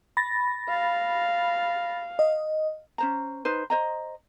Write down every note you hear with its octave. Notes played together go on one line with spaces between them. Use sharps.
B5 A6 A#6
F5
D#5
C#4 C5 A#5
D#4 B4 C5
C5 D#5 A#5